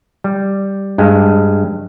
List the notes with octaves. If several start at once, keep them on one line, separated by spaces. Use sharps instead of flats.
G3
G2 G#3